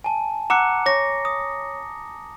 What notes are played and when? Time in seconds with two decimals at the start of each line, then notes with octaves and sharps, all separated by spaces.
0.04 G#5 A5
0.50 F#5 A#5 D6 E6 F#6 C#7
0.86 C#5 A5 C#6 D6 A#6
1.25 D#6